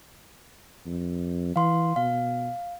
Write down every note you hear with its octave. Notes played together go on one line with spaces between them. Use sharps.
F2
E3 F5 C6
B2 F5